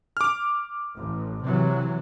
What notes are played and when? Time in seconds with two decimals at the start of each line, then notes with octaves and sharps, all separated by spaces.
0.17 D6 F6
0.93 A1
1.41 C3 E3 F#3